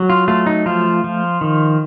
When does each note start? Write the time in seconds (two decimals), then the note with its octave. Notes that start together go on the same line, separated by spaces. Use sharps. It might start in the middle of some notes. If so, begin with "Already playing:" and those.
Already playing: F#3
0.10 F4
0.28 A3 F4
0.46 D#4
0.66 F3 F4
1.04 F3
1.41 D#3